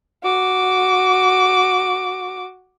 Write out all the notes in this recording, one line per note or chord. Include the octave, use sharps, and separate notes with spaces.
F#4 D6